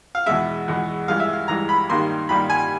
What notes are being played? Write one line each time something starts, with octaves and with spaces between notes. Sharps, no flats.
F5
E2 B2 G#3 E5
E2 B2 G#3
G2 E3 G#3 F5
E5
F5
G2 E3 G#3 A#5
B5
G2 D#3 G3 A#3 C6
G2 D#3 G3 A#3 B5
G#5